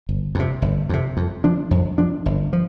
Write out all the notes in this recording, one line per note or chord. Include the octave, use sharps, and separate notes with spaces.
G1
F2 C3
G1
F2 C3
F2
F3 D4
F2
F3 D4
G1
F3